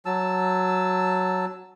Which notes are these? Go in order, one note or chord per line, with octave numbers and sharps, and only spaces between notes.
F#3 A5 E6